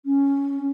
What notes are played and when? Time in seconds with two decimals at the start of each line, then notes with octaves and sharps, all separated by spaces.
0.05 C#4